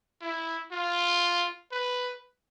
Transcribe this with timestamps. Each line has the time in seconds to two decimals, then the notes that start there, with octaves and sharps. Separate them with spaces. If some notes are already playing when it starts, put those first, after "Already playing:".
0.21 E4
0.72 F4
1.72 B4